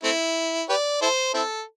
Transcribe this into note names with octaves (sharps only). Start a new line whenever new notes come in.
A3 C4 E4
G4 B4 D5
E4 A4 C5
C4 E4 A4